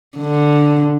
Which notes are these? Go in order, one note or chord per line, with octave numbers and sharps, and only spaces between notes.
D3